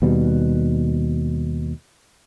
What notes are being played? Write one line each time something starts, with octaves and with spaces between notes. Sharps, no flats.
D#2 B2 G3